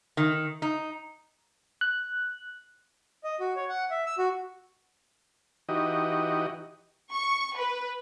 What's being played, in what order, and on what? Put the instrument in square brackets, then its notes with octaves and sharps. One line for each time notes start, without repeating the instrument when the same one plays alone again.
[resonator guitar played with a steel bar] D#3
D#4
[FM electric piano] F#6
[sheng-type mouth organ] D#5
F#4
C#5
F#5
E5
E6
F#4
[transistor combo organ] E3 D#4 F#4 G4 D#5
[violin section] C#6
B4